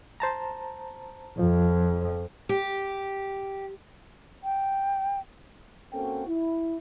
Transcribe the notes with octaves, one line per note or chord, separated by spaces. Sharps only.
C5 A5 A#5
F2 F3
G4
G5
A#3 C4 C#4 F#4 A4 G5
E4